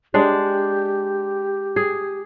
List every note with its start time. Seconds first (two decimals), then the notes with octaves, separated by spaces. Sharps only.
0.14 G#3 D4 G4
1.76 G#4